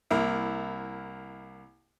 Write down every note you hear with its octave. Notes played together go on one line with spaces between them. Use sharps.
C2 A#3 E4